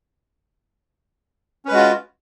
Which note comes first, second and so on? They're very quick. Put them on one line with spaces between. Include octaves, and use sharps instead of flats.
C#4 B4 G#3 F#4 F4